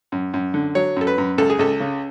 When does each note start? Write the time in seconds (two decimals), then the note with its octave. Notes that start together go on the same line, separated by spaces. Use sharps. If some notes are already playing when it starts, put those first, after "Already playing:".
0.12 F#2
0.34 F#2
0.54 D3
0.75 F#3 C#5
0.96 F#2 A4
1.07 B4
1.18 F#2
1.38 C#2 A4
1.50 G#4
1.59 C#2 A4
1.80 C#3